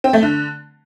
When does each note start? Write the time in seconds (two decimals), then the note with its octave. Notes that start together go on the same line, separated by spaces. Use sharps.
0.04 C4
0.13 A3
0.23 D3